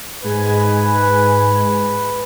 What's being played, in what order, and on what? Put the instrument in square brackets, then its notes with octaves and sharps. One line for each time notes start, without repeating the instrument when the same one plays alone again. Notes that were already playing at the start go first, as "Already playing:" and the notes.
[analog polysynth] G#2 G#3 G#5 [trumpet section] B4